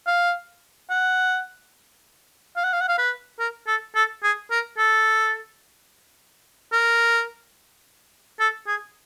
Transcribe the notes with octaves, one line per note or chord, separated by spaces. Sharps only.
F5
F#5
F5
F#5
F5
F#5
F5
B4
A#4
A4
A4
G#4
A#4
A4
A#4
A4
G#4